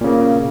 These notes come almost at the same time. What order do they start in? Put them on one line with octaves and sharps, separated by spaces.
A#2 C#3 A#3